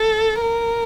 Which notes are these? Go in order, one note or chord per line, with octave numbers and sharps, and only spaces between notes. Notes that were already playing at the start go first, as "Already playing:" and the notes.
Already playing: A4
A#4